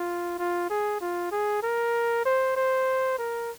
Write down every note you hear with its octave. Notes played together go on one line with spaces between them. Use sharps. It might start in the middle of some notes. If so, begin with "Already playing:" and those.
Already playing: F4
F4
G#4
F4
G#4
A#4
C5
C5
A#4